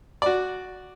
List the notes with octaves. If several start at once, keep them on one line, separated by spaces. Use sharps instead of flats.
F#4 D5